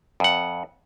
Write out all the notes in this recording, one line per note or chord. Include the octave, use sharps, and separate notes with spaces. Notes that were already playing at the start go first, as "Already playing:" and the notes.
F2 F#5